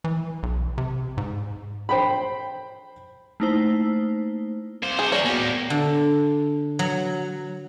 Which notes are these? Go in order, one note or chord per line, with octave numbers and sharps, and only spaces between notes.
E3
B1
C3
G#2
C5 G5 B5
A3 A#3 D#4 E4 C5
C2 C5 F5 D6
G#4
E3 G3 A#3 C#5 D5 G#5
A#3 B3 F#4 G4
A2
D3
F#3